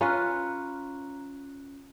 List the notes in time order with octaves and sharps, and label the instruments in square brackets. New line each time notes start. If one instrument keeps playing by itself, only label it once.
[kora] C#4 F4 B4 [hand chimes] A#5 F#6